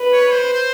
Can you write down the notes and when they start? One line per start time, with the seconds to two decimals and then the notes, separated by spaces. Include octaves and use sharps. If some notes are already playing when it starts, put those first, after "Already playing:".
Already playing: B4
0.13 C#5
0.33 C5
0.54 C5